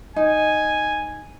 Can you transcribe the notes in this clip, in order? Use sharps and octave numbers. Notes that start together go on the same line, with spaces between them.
D#4 G#5